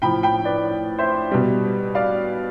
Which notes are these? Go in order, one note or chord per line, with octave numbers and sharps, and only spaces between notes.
A2 F3 G5 B5
G5 B5
B4 D5
C5 E5
B2 G3
D5 F5